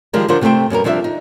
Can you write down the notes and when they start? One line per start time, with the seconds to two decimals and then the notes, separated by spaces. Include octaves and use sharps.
0.13 D#3 F3 G3 G#3 G4 A#4
0.28 D3 F3 D4 F4 A#4 C5
0.41 C3 A3 G4 C5 G5
0.70 F#2 B2 G3 A#4
0.84 C3 F3 G3 D4 D5 E5
1.04 D#4